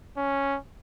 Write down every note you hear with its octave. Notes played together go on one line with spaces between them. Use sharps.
C#4